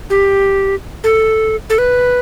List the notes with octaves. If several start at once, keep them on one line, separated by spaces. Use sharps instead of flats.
G4
A4
A4
B4